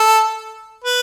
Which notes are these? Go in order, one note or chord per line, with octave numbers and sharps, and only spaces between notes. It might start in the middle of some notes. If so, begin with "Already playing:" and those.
Already playing: A4
B4